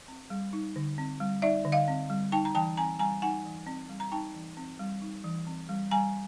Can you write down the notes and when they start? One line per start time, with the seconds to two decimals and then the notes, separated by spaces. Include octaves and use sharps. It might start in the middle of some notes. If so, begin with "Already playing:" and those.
0.08 C4
0.30 G3
0.53 D#4
0.76 D3
0.98 C4
1.20 G3
1.42 D#4 D5 E5
1.65 D3
1.72 D#5 F5
1.88 C4
2.10 G3
2.32 D#4 G5 A5
2.45 A#5
2.55 E3 G5 A5
2.77 C4 G#5 A#5
2.99 G3 G#5 A#5
3.22 D#4 F#5 G#5
3.45 E3
3.67 C4
3.89 G3
4.00 A#5
4.12 D#4 G5 A5
4.34 E3
4.57 C4
4.79 G3
5.02 D#4
5.24 E3
5.47 C4
5.69 G3
5.91 G3 G#5 A#5